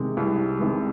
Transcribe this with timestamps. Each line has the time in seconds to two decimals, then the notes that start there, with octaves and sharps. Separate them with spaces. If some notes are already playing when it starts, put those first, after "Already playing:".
Already playing: C3 D#3 G#3
0.17 C2
0.59 C3 D#3 G#3